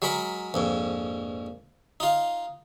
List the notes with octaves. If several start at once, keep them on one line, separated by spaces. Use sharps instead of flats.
F#3 G#3 A#4 B5
A#1 F2 G#2
D#4 F4